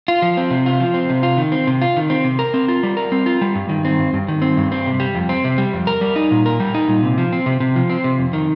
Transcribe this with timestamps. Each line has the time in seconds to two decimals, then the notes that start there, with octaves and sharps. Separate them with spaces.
0.08 F4
0.22 F3
0.37 C4
0.51 C3
0.66 F4
0.80 F3
0.94 C4
1.10 C3
1.23 F4
1.37 D#3
1.52 C4
1.67 C3
1.82 F4
1.97 D#3
2.10 C4
2.24 C3
2.39 A#4
2.54 C4
2.68 F4
2.83 G3
2.97 A#4
3.12 C4
3.26 F4
3.41 G3
3.55 G2
3.69 D#3
3.85 C4
3.99 G2
4.14 G2
4.28 D#3
4.42 C4
4.57 G2
4.72 C4
4.86 C3
5.00 G3
5.15 F2
5.29 C4
5.44 C3
5.58 G3
5.73 F2
5.87 A#4
6.01 G3
6.16 D#4
6.31 A#2
6.46 A#4
6.60 G3
6.74 D#4
6.88 A#2
7.03 C3
7.18 F3
7.33 C4
7.46 C3
7.60 C3
7.76 F3
7.90 C4
8.04 C3
8.18 F2
8.33 D#3